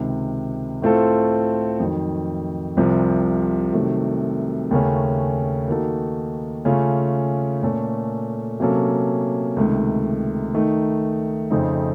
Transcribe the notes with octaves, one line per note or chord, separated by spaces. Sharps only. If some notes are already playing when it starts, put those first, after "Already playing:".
Already playing: C#2 C3 D#3
A2 A3 C4 F4 A4
F2 D#3 F#3
C2 C3 F3
C2 C3 D#3 F#3 A3
D#2 C#3 A3 C#4
D#3 A#3 D#4 F#4 A4
C#3 A3 C#4 F4
A#2 A3 C#4 A4
C3 F#3 A#3 C#4 A4
C#2 C3 D#3 A3
D#3 A3 D#4
F2 C#3 A3 C4 D#4